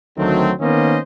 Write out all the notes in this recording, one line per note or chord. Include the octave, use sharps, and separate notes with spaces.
D2 D#3 F#3 A3 C4
D#3 A#3 B3 C#4 C5 D#5